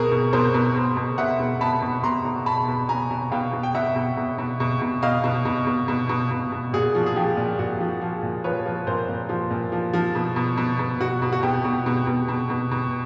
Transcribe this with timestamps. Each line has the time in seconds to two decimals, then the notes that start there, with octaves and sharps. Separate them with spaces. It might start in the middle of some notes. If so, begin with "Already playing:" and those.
Already playing: B2 G#4 A#4
0.11 B2
0.33 B2 A#4 C5
0.54 B2
0.76 B2
0.97 B2
1.18 B2 E5 F#5
1.39 B2
1.61 B2 A5 B5
1.82 B2
2.04 B2 A#5 C6
2.25 B2
2.46 B2 A5 B5
2.68 B2
2.89 B2 G#5 A#5
3.11 B2
3.31 B2 F5 G5
3.53 B2
3.63 G5
3.75 B2 E5 F#5
3.96 B2
4.17 B2
4.38 B2
4.60 B2
4.82 B2
5.02 B2 D#5 F5
5.24 B2
5.45 B2
5.67 B2
5.88 B2
6.09 B2
6.31 B2
6.52 B2
6.73 A#2 F#4 G#4
6.95 F3
7.06 G#4
7.16 F3 G4
7.37 A#2
7.59 A#2 F#4
7.80 F3
8.02 F3
8.23 A#2
8.44 F3 B4 C#5
8.66 F3
8.87 A#2 A#4 C5
9.08 A#2
9.29 F3
9.50 A#2
9.72 F3
9.94 F3
10.15 B2
10.36 B2
10.57 B2
10.79 B2
11.00 B2 F#4
11.22 B2
11.32 F#4
11.43 B2 G4
11.64 B2
11.86 B2
12.07 B2
12.28 B2
12.50 B2
12.71 B2